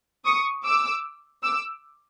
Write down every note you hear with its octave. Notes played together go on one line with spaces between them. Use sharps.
C#6 D#6
D6 E6
D6 E6